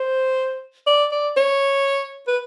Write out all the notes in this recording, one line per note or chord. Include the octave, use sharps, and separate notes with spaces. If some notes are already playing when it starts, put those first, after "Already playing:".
Already playing: C5
D5
D5
C#5
B4